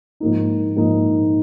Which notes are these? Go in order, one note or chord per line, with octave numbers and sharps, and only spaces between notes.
G#2 F3 A#3 D#4
G#2 F3 A#3 D#4